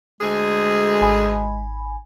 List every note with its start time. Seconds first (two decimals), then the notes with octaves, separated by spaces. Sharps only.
0.21 D2 G#3 G#4
1.01 G#1 G#5 B5